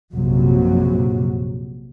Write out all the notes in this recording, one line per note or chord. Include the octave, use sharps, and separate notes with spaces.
A#1 F#2 C3 F#3